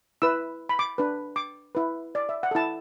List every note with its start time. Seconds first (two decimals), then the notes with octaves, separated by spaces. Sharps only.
0.22 E4 B4 E6
0.69 B5
0.79 D6
0.98 D4 B4
1.36 D6
1.75 E4 B4
2.15 D5
2.29 E5
2.43 F#5
2.51 E4 A4 A5